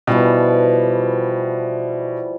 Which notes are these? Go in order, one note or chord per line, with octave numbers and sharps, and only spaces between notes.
B2 E3 F3 G3